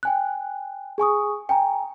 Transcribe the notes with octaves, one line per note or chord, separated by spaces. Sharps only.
G5 G#5 F#6
G#4 G#5 C#6 D#6
G5 G#5 A#5